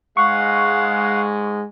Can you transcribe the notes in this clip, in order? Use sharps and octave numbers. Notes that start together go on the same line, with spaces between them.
G#2 G#3 F5 F#5 C#6